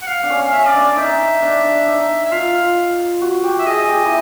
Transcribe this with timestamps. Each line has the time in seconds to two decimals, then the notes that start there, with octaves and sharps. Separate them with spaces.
0.02 F#5
0.08 F5
0.23 D4
0.30 C#4
0.42 F5
0.52 C#4 E5
0.67 D5
0.74 D4
0.82 D5
0.97 D#4 E5
1.42 D4
1.65 D4
1.87 D#4
2.25 E5
2.31 F4 F5
3.22 F#4
3.44 G4
3.59 E5
3.66 G#4 D#5
3.89 G4
4.06 E4